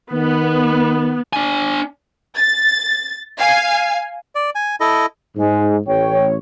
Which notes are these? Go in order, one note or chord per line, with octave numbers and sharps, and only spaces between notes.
D#3 B3
D4 G#5
A6
F5 G#5
D5
G#5
E4 A4 D#5
G#2 G#3
A1 C#5 G5